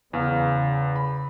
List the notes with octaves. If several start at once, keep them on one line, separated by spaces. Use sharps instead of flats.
E2 C#3 F5
B5